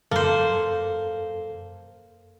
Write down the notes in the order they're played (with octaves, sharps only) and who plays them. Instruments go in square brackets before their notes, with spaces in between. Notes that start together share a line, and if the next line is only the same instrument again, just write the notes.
[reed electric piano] F#2 A4 [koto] A#3 C5